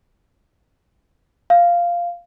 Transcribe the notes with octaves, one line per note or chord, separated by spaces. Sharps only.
F5